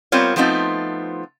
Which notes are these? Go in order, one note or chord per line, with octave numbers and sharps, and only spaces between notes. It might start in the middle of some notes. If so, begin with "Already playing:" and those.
G3 B3 C4 F4 A#4 C#5
F3 A3 B3 C4 D#4 F4